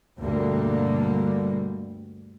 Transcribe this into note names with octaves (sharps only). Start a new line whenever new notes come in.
D2 G2 B2 D3 G3 A#3